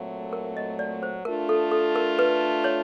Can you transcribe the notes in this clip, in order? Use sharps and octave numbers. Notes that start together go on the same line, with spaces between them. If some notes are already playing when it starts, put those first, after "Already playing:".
Already playing: A#2 F#3 A3 C4
A#4
D#5
D5
C5
A3 D4 F4 A#4
A4
A4
A#4
B4
C#5